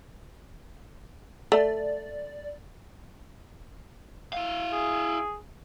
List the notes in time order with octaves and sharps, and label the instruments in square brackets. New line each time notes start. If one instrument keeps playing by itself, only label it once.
[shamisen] A3 [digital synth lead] D5
[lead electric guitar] E4 F5
[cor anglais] G#4